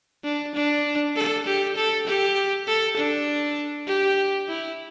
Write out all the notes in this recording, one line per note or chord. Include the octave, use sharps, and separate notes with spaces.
D4
D4
A4
G4
A4
G4
A4
D4
G4
E4